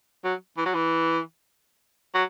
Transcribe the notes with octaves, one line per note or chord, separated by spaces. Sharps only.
F#3
E3
F#3
E3
F#3